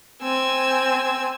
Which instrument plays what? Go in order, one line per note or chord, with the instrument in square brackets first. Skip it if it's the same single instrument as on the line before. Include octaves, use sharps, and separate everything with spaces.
[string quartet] C4 G#5 E6